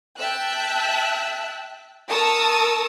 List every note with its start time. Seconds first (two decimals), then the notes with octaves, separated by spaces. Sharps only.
0.18 E5 G5 A5 E6 F#6
2.07 A#4 A5 C#6 D#6 E6